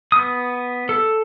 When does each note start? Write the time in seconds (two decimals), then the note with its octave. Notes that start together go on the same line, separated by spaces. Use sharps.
0.12 B3 D#6
0.89 A4